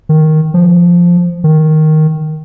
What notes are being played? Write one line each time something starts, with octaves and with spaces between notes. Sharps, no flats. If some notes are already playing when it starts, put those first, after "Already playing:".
D#3
F3
D#3